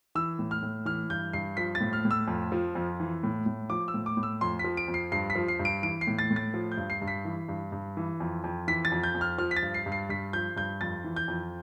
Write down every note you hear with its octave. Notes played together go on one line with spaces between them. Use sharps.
E3 E6
A2
F6
A2
E3 F6
G2 G6
G2 C7
F3 B6
A6
A2
F6
A2
E6
F2
F3
F2
E3
A2
A2
F3 D6
E6
A2
D6
A2
E6
F2 C6
F3 B6
D7
F2
C7
G2 C7
B6
F3
C7
G2
D7
E3 D7
C7
A2
A6
A2
A6
F3
G6
G2
C7
G2
B6
E3
G2
G2
E3
F2
F2
E3 B6
A6
F2
G6
F2
F6
F3 F6
B6
A6
G2
C7
G2
C7
G2 B6
F3 G6
G2 G6
F2 A6
E3
G6
F2